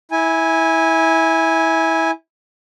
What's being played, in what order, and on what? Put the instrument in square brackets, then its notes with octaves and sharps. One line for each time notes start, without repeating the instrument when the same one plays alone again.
[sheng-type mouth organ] E4 G#5